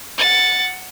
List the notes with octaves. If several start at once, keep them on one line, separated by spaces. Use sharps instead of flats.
F#5 A6